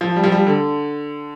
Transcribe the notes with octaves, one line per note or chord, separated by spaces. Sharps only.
F3
G3
F3
G3
D3